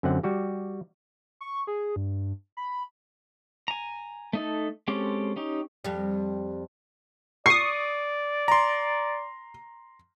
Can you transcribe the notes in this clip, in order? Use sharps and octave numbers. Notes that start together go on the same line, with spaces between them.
F#2 D3 C4 F#5
G3 F#4 G4
C#6
G#4
G2
B5
G#5 A#5
A3 D#4 A4
G#3 C4 C#4 G4 A4
C#4 D#4 G4
F2 G3
D5 C#6 D#6 C7
A#5 C6